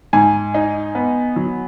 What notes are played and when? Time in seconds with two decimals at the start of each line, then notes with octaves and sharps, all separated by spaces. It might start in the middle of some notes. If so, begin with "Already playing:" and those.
0.13 G#2 G#5
0.54 D#4
0.95 B3
1.36 F#3